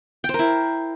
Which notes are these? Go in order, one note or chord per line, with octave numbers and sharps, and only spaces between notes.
G5
C5
A#4
E4